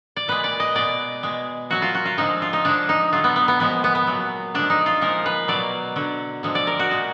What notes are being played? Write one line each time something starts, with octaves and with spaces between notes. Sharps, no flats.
D5
A#2 G#3 B4
D5
D#5
B2 G#3 D5
B2 G#3
A#2 F#3 F#4
F4
F#4
F4
D3 F3 G#3 D#4
F4
D#4
D3 F3 G#3 D4
D#4
D3 F#3 F4
B3
B3
B3
A#2 F3 G#3 B3
B3
B3
A#2 F#3
D3 F3 G#3 D4
D#4
F4
A#2 F3 G#3 A#4
B4
B2 F#3 D5
D3 F#3
D3 F3 G#3
D5
A#4
F#4
A#2 G#3